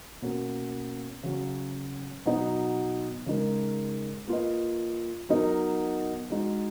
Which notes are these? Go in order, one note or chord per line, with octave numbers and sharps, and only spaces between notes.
B2 A#3 C#4
C#3 F#3 C#4 F#4
B2 F#3 B3 D#4
C#3 G#3 D#4 A#4
A#3 F4 B4 D#5
F#3 B3 D#4 A#4 D#5
G#3 D#4 F#4